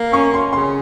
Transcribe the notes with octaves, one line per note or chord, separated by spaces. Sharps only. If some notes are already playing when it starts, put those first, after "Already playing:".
Already playing: A#3
C#4 C#6
C#4 C6
C#3 C6